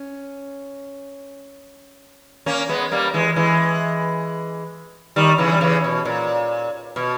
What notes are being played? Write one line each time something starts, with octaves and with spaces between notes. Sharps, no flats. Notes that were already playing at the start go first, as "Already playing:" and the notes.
Already playing: C#4
A#3 C#4
G#3 B3
G3 A#3
E3 G#3
E3 G#3
D#3 G3
C#3 E3
G3
C#3 E3
B2
A#2
B2